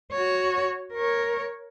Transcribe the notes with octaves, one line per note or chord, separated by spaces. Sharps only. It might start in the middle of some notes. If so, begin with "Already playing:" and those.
F#4 C#5
A#4 C#5